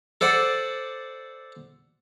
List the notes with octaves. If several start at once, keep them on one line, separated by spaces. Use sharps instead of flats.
A4 C5 D5 F#5